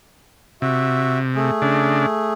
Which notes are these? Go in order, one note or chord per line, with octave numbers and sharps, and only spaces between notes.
C3 F#4 E5
A3 G#4
C#3 D4